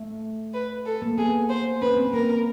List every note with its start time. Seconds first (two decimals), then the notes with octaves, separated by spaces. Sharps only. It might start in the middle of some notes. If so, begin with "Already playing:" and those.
Already playing: A3
0.54 B4
0.86 A4
1.02 A#3
1.18 B3 G#4
1.49 C5
1.81 C#4 B4
1.97 C4
2.13 A#3 A#4